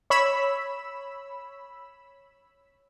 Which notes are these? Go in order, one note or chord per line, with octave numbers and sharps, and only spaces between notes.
C#5 B5 E6